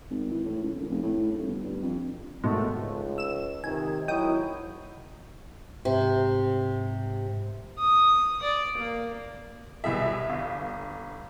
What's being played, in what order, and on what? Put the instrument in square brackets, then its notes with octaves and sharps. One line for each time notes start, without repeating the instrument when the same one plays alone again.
[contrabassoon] G#1
E3
A2
C#2
A#1
F1
A2
D#1
G1
G2
F2
[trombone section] G#1 A3 [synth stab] G#2 B2
[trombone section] C#2
[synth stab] E6 E7
[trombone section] C3 D#3 [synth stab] G#5
[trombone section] G#1 F#3 E4 [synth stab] D#5 G5 D#6
[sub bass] G#2 [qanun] C3
[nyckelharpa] D#6
D5
A#3
[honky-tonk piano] C2 B2 G#4 E5
G1